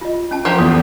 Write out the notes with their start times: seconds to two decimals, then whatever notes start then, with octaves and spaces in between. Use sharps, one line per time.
0.01 F4 D#5
0.31 C#4 A5
0.45 F3 G4 A#5
0.58 E2 A4